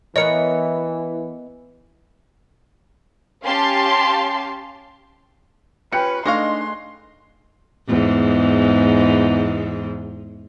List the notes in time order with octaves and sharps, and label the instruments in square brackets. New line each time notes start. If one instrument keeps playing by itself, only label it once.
[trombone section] E3 [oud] B3 A#4 C#5 [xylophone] D#5 C#7
[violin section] C#4 G4 F5 A5 C6
[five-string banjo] C#4 [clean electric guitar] F4 G4 C#5 [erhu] B4 [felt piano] G5 F#6 C#7
[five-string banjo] G#3 D#5 F5 [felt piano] A3 C#6 [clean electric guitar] D4 D#4 [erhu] C6
[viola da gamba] E2 G#2